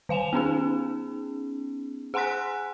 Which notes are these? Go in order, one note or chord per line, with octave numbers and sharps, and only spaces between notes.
D#3 F5 G#5 E7 F7
B3 C#4 D#4 G#4
G#4 F#5 G#5 C6 F#6 B6